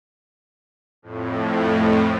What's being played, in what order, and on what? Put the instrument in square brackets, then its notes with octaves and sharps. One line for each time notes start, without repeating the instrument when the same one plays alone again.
[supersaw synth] F2 A2